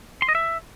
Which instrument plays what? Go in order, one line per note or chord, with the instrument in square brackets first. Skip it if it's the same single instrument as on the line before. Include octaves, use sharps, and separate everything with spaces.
[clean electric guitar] C6
D#5
E5